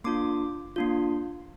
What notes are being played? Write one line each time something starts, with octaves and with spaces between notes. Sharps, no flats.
A#3 D4 F4 D6
A#3 D4 F4